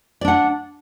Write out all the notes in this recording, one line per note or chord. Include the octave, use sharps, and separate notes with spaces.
D4 D5 F#5